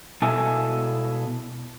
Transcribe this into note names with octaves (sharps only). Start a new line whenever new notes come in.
B2 E4 A4 G#5